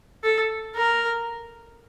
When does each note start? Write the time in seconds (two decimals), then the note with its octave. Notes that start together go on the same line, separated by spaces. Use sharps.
0.24 A4
0.76 A#4